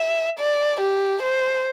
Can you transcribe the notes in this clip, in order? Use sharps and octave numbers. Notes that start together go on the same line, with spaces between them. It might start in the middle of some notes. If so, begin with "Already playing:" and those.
Already playing: E5
D5
G4
C5